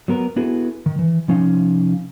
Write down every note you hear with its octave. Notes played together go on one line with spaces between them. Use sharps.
F#3 B3 A#4 B4
B3 E4 F#4 G#4 A4 B4
D#3
E3
C3 F3 C#4 D#4 F5